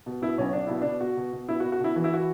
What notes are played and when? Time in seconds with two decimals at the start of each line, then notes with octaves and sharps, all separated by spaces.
0.06 B2
0.22 B2 E4
0.38 B1 C#4
0.53 B1 D4
0.67 B2 E4
0.81 B2 D4
1.00 B2 F#4
1.17 B2
1.33 B2
1.48 B2 E4
1.60 F#4
1.63 B2
1.72 F#4
1.80 B2 E4
1.96 E3 F#4
2.04 E4
2.13 F#4